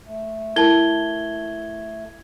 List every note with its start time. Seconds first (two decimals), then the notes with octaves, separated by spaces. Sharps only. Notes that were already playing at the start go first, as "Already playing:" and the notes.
0.06 A3
0.56 E4 A4 A#4 A5 G#6 G7